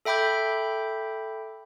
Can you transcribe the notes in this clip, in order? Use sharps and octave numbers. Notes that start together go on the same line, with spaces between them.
A4 E5 G5 B5 D6 G6